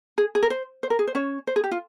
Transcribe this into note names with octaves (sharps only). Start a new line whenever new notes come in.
G#4
G#4
A#4
C5
C5
A#4
G#4
C5
C#4 C#5
C5
G#4
G4
F4